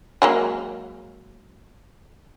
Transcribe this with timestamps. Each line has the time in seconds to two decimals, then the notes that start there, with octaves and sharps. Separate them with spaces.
0.22 F#3 G#3 A#3